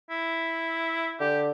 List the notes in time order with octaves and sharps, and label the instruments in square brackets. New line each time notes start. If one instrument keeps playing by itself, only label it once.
[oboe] E4
[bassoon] D3 [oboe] G4